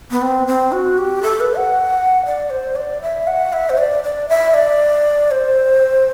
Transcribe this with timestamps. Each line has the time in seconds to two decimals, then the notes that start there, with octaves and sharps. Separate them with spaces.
0.11 B3
0.22 C4
0.47 C4
0.72 F#4
0.98 G4
1.23 A4
1.40 B4
1.57 F#5
2.25 D5
2.50 C5
2.76 D5
3.02 E5
3.27 F#5
3.53 E5
3.70 C5
3.78 D5
4.03 D5
4.29 E5
4.54 D5
5.31 C5